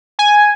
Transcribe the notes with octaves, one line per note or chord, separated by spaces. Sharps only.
G#5